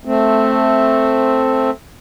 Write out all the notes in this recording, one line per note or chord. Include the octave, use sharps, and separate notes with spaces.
A3 C4